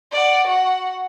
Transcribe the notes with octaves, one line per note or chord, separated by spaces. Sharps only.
D5 F#5
F#4 F#5